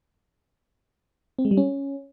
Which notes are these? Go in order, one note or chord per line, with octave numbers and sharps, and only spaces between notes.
C4
G#3
G3
C#4